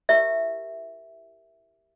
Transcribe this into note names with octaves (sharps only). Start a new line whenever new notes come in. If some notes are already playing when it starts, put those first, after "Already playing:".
E4 G4 A#4 E5